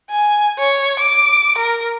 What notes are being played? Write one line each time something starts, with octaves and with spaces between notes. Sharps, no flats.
G#5
C#5
D6
A#4